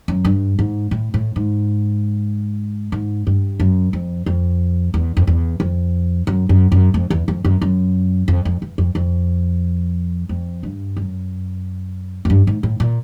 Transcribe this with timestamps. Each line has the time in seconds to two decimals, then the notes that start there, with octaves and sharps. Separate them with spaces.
0.08 F#2
0.25 G2
0.59 G#2
0.91 A2
1.14 A2
1.36 G#2
2.92 G#2
3.27 G2
3.60 F#2
3.93 F2
4.26 F2
4.94 E2
5.17 F2
5.27 E2
5.60 F2
6.27 F#2
6.49 F#2
6.72 F#2
6.94 F2
7.10 E2
7.28 F2
7.45 F#2
7.62 F#2
8.28 F2
8.45 F2
8.62 E2
8.78 F2
8.95 F2
10.29 F2
10.63 G2
10.97 F#2
12.25 F#2
12.30 G2
12.47 G#2
12.63 A2
12.80 A#2